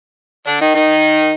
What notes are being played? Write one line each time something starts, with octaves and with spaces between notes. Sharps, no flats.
D3 D4
D#3 D#4
D#3 D#4